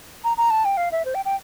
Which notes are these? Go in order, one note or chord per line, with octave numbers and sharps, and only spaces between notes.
A#5
A#5
A5
G5
F5
E5
C5
G5
G5